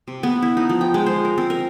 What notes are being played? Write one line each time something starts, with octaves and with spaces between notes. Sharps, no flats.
C3
B3
E4
D#4
F3
G5
G#3
C5
A#4
C4
A#4